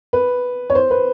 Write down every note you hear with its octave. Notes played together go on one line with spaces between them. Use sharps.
B4
C#5
C5
B4